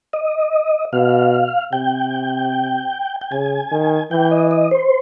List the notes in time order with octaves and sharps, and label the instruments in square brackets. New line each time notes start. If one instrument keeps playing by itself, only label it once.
[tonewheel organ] D#5
[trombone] B2 [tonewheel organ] F5
[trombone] C3 [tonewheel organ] G5
[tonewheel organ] G5
[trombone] C#3 [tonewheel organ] G#5
[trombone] D#3
[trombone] E3 [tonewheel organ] G5
[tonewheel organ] D#5
D#5
C5